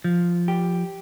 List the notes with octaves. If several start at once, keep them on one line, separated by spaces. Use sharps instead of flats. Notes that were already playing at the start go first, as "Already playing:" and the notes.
F3
G4